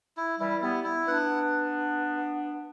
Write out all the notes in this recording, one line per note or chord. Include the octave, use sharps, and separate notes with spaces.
E4
E3 G3 E4
G3 B3 E4
E4
B3 D4 F#5